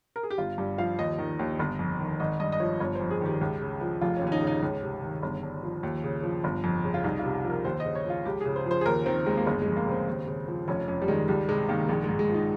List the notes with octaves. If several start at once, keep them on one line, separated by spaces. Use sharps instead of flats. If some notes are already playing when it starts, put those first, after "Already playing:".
A#4
G#4
G4
G1 F4
G2 G4
F3 F5
D#2 D#5
D#3
D#2
G1
F2
D#3
G#1 D#5
G2 D#5
D#5
F3 C#5
G1 C#5
C5
F2
G#4
D#3 G4
C#2
C#3
F3
F1 F4
C#4
D#2
C#4
D#4
C#3
D#4
C#2 C#4
C3
D#3
G1
G2
F3
D#2
C#3
F3
G1
F2
C#3
F4
C2 D#4
F4
C3
G4
F3
A#4
D#2 C5
D#5
C#3
C#5
F3 F4
C#2 G4
C#3 G#4
C5
F3 C5
G#4
D#2 A#4
D#3 C4
D#2 G#3
A#3
G1 G#3
F2 G#3
A#3
C#3 C4
D#2
C#3
F3
F1 C#4
F2 C#4
G3
D#3 G#3
C#2 G3
C3 G#3
D#3 A#3
A#1 G#3
G#2 G#3
G#3
F3 D#4